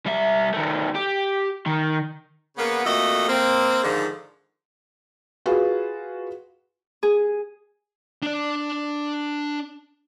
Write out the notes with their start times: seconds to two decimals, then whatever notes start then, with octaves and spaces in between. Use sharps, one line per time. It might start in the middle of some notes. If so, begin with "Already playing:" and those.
0.07 G3 E5
0.54 D#3 A3
0.95 G4
1.66 D#3
2.57 C#3 A#3 B3
2.85 F2 A3 A#3 F#4 D#5
3.28 A#3 C4
3.83 G#2 D3 D#3 F3
5.46 F4 F#4 G#4 B4
7.03 G#4
8.23 D4 D5